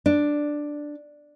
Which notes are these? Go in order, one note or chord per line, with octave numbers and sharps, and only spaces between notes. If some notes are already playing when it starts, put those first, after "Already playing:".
D4